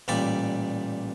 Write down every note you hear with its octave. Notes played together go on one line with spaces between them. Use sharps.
A1 A#2 G3 D5 B5 D6